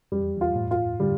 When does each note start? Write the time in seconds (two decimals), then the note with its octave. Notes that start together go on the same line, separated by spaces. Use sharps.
0.12 F2 G3
0.21 E2
0.37 E2 F4
0.51 G2
0.56 A2
0.71 F4
1.00 D3 G3